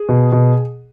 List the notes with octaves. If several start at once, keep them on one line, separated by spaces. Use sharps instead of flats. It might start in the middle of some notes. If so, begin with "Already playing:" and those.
Already playing: G#4
B2
B2